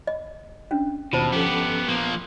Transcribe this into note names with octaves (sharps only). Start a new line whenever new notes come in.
D#5
C#4 D4
D#2 B2 F4 C5 A5
F3 B3 C#4 G4 A4
F3 A#3 B3